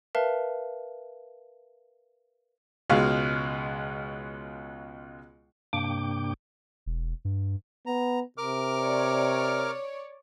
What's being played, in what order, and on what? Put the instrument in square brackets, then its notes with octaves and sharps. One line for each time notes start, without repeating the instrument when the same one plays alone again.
[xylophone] A#4 B4 E5 F5 A5
[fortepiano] C#2 B2 G#3 F5 C#6 F6
[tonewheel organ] G2 C3 A#3 D4 G5 D6
[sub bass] E1
G2
[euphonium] B3 [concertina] A#5
[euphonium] C3 [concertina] A#4 D6 F6
[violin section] C#5 D5